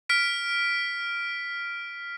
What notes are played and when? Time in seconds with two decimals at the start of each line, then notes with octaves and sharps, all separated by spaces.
0.09 F6 B6 D7